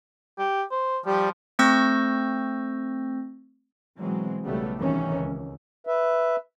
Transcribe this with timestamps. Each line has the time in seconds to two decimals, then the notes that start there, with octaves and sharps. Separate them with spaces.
0.38 G4
0.71 C5
1.06 F3 G3
1.59 A3 C4 C#6 E6 G6 A#6
4.00 B2 E3 F#3 G#3 C4
4.44 B1 C#3 G3 A3 B3
4.79 G#1 C3 D#3 E3 C#4
5.13 C#2
5.87 B4 E5